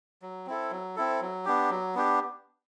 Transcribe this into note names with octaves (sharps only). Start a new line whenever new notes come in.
F#3
C4 E4 A4
F#3
C4 E4 A4
F#3
B3 D4 G4
F#3
B3 D4 G4